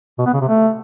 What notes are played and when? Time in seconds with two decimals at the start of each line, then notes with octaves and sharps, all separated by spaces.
0.18 B2
0.26 B3
0.33 C#3
0.41 C3
0.48 A3